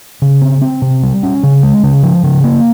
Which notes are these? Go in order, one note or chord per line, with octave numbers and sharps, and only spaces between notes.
C#3
C4
C4
C3
G3
C#4
C#3
G#3
C#3
F3
C#3
A#3